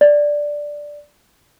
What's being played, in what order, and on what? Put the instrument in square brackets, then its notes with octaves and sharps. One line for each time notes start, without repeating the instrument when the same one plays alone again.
[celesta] D5